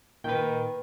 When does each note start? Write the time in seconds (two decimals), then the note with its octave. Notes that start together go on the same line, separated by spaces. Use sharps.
0.24 A#2 D#3 B4 G5